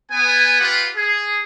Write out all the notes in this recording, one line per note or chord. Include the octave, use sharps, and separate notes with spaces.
B3 G#5
F4 G4 B4 F#5
G#4